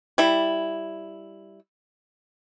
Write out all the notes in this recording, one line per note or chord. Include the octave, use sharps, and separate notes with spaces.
G3 E4